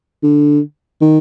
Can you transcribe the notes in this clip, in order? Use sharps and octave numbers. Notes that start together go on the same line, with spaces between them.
D3
D#3